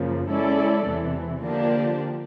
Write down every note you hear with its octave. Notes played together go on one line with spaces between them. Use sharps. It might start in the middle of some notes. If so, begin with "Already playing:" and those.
Already playing: F#2 C#3 F3 A#3
G#3 C#4 E4 A4 D5
E2 C3 E3
D3 F3 A#3 D4 G4